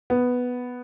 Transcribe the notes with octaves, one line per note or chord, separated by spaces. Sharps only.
B3